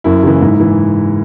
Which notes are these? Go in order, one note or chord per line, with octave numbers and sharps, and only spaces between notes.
F#2 E4
C#3 E3
G#2
E3